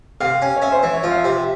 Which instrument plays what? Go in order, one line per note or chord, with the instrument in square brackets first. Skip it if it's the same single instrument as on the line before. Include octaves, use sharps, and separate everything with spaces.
[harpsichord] C3 [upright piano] F5
[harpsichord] C#4
[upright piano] C#5
[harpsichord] C#4 [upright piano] E5
[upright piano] C5
[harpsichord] E3 [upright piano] E5
[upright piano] C#5
[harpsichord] F3 [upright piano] E5
[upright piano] F5
E5
[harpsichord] C3
[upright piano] E5